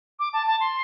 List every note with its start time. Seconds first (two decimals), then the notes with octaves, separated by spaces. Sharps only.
0.19 D6
0.33 A5
0.47 A5
0.60 C6